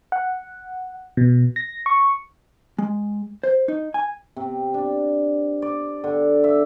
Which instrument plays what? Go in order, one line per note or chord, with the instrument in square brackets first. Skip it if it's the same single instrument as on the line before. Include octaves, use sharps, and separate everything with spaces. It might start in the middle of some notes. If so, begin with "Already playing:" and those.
[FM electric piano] F#5
B2
A#6
C#6
[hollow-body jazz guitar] G#3
C5
D#4
G#5
[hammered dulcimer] C3
D4
D5
D3
E5